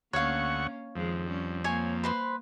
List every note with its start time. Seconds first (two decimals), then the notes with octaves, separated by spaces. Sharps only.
0.13 D2 A#3 C#4 C#5 F5 F#5 C#6
0.96 F2 D#3 F3 G#3
1.27 G3 C#4
1.64 A#3 C#5 G#5
2.04 B4 C5 C6